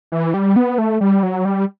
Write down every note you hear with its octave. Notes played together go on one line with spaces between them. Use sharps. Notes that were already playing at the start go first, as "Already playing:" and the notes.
E3
G3
B3
A3
G3
F#3
G3